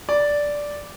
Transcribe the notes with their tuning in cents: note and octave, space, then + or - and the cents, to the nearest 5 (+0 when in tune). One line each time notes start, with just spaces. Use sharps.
D5 -5